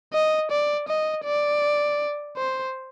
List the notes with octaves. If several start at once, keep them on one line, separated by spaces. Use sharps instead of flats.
D#5
D5
D#5
D5
C5